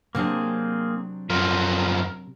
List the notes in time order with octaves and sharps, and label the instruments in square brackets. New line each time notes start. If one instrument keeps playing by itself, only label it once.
[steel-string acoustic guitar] C3 F#3 D4 [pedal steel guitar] A#3 C4 G#4
[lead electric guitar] F#2 F3 [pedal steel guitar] A#4